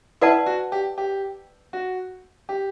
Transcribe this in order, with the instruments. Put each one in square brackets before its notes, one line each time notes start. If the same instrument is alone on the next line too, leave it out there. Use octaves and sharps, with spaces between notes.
[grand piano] E4 [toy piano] B4 D5 F#5 A5
[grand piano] F#4
G4
G4
F#4
G4